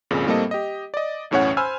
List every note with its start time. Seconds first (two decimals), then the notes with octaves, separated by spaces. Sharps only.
0.11 G#1 F2 A#2 C#3
0.26 A2 G3 A#3 C4 A4 D#5
0.51 G4 D#5
0.94 D5 D#5
1.31 B1 E2 A2 C#4 C#5 F#5
1.57 C5 G#5 B5 E6 F6